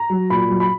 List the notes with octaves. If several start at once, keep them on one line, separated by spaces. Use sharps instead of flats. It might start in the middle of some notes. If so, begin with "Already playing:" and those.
Already playing: A#5
F#3
A#2 B5
F#3
B5